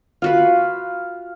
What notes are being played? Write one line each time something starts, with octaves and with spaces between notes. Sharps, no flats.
F4 F#4 B4 F5